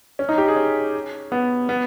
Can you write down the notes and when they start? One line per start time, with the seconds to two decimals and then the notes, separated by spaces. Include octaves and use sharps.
0.19 C#4
0.29 D#4
0.38 G4
0.48 G#4
0.56 C#4
1.32 B3
1.69 B3